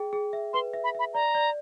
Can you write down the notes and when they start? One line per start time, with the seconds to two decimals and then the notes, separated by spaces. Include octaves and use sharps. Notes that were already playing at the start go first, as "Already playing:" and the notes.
Already playing: G#4 G5
0.13 G#4
0.33 E5
0.53 B4 C6
0.74 E5
0.84 B5
0.95 E5 B5
1.14 D5 A#5
1.35 D5